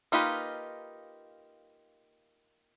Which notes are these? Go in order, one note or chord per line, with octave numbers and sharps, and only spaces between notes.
A#3 D#4 F4 G4 B4